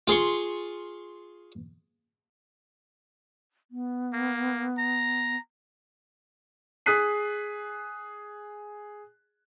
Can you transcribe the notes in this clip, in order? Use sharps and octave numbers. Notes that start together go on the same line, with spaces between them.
F4 G#4 C6 C#6
B3
A#3
A#5
G#4 D#6 F#6 B6 C7 D#7